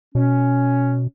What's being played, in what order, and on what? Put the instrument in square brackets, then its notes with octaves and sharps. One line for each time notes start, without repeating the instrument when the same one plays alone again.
[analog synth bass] B2 [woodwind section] C#4